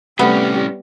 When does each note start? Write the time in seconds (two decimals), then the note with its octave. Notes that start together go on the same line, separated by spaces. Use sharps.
0.19 A2 C3 G3 A3 B3 C#4